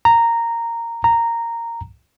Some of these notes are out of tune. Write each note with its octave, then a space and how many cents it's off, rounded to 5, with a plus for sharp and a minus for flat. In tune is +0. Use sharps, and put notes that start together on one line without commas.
A#5 -10
A#5 -10